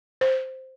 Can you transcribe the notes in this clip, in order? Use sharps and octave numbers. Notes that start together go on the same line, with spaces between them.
C5